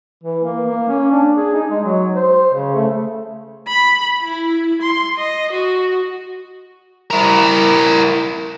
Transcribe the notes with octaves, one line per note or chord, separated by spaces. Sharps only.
E3
A#3
A#3
C#4
D4
G#4
D#4
G#3
F#3
C5
C#3
A3
B5
E4
C6
D#5
F#4
E4 A#4